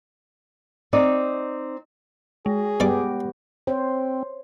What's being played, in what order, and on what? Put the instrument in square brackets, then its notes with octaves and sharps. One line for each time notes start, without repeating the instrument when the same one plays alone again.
[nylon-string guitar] C4 D#4 D5
[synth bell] G#3 [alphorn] G#4
[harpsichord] G2 D5 D6 [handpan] B3 G4
[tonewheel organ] C4 [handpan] C5 C#5